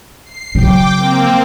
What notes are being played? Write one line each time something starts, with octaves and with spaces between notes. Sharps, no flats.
C7
C#3 F#3 G5 D6
A#3 C4